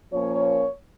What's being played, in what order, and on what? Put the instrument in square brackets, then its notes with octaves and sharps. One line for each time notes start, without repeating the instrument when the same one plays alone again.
[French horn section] A#2 F3 A#3 C#4 C#5